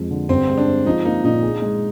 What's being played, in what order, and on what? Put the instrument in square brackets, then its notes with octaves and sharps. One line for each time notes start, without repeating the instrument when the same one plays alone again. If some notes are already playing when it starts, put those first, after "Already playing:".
Already playing: [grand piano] F2 G#3
D3
[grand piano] G2 [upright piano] C4
[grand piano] G#3
[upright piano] D4
[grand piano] C4
[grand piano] F3 [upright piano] D#4
[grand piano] A#3 [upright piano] D#4
[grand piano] A#2 [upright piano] D#4
[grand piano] G#4
G#3